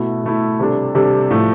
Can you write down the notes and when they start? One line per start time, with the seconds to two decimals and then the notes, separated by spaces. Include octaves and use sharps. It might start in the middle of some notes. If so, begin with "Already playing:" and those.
Already playing: B2 A3 E4
0.24 B2 A3 E4
0.60 C3 G3 D4 A4
0.95 C3 G3 D4 A4
1.30 A2 F3 A3